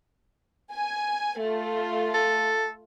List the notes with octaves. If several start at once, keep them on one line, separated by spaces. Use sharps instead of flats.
G#5
A3 F4
A4